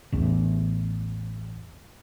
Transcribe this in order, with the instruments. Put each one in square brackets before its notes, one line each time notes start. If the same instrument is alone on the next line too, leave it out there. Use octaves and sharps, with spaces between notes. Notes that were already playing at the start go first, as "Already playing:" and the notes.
[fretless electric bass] A1 E2